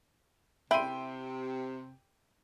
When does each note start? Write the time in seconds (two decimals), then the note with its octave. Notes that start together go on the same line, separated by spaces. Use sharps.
0.71 C3 E4 E5 G5 C6 D#7